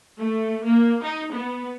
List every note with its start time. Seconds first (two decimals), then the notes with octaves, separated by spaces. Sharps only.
0.19 A3
0.66 A#3
1.02 D#4
1.34 B3